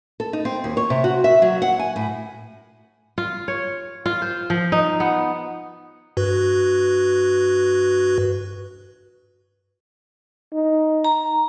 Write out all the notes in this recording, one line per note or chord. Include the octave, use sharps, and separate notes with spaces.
A4
D#4
C4
D#2
C#5
C3
F#4
E5
F#3
F#5
G#5
A2
F4
C#5
F4
C5
F3
D#4
B3
G2 F#4 B4
D#4
A#5